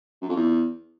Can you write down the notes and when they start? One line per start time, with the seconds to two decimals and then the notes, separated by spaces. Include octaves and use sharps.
0.21 F#2
0.29 F2
0.36 E2